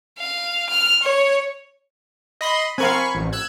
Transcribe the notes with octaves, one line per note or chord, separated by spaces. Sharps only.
F5
F6
C#5
D#5 B5 C6
C4 A#4 F5 G#5 B5 C#6
A1
E6 F#6 G#6